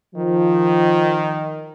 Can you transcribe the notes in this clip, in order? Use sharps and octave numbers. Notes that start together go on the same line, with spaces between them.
D#3 F3